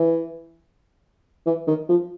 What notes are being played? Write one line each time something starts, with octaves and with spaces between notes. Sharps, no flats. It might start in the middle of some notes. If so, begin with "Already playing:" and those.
Already playing: E3
E3
D#3
F3